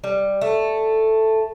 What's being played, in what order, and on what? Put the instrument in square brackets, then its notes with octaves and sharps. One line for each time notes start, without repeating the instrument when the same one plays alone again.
[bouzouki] G3
A3